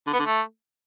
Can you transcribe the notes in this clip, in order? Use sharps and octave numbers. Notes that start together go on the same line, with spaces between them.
D3
B3
D3
A3